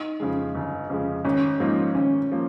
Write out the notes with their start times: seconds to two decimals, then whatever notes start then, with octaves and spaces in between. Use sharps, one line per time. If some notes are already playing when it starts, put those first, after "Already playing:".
Already playing: D#4
0.20 F2 C#3 G#3
0.55 G1
0.89 F2 C#3 G#3
1.24 G#1 C#4
1.60 G#2 F3 A#3 D#4
1.95 G#1 C#4
2.32 F3 A#3